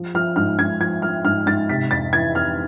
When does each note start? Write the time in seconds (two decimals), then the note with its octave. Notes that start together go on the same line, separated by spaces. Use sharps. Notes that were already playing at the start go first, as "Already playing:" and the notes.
Already playing: F3
0.14 F3 F6
0.36 G#2 F6
0.59 G#2 G#6
0.80 F3 G#6
1.02 F3 F6
1.25 G#2 F6
1.46 G#2 A6
1.69 C3 B6
1.91 F2 A6
2.13 E3 G#6
2.35 F2 F6